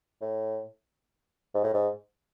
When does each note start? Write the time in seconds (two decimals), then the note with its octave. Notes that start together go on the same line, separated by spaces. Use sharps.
0.21 A2
1.54 G#2
1.63 A2
1.74 G#2